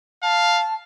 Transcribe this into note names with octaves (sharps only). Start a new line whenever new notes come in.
F5 A5